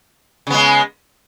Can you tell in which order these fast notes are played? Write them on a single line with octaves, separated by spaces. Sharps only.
C#3 B3 G#3